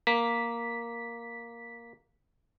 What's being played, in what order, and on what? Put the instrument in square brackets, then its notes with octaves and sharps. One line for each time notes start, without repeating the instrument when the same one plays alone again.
[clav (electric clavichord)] A#3 [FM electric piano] B6